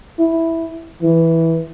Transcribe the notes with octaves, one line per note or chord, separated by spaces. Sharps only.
E4
E3